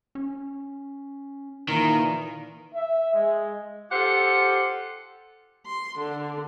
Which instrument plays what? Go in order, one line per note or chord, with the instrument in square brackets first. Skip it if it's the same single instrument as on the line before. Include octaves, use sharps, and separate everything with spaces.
[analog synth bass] C#4
[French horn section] A#2 E3 A#3 [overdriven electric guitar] D#3 [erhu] A#4
[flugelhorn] E5
G#3
[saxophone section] F4 G4 A4 C5 F#5
[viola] C6
D3